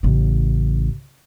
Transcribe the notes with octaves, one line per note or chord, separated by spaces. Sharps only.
A1 C#3